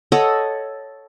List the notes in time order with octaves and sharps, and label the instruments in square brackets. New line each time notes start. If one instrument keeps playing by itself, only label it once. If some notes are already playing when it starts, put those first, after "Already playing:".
[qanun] A4 C#5 D#5 F#5